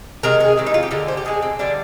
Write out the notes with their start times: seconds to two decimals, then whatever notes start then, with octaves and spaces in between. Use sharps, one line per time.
0.23 C3 D#3 G#3 A#4
0.40 G#4
0.57 C3 D#3 G#3
0.67 D#4
0.74 F4
0.83 G4
0.91 D3 G#3 A#4
1.08 C5
1.17 G4
1.25 D3 G#3 G#4
1.42 C4
1.59 D3 G3 D4